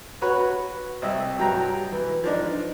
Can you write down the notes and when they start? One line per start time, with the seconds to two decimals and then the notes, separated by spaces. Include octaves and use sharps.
0.22 F#4 B4 C#5
1.02 C2 D#5 E5
1.38 G2 F#3 G5 A#5
1.92 E3
2.24 F3 D4 D#4